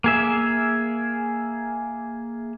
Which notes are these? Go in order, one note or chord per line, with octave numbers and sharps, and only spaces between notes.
A#3 G#4 E5